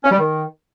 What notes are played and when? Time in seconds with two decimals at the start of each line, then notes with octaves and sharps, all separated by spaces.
0.03 C#4
0.11 G3
0.19 D#3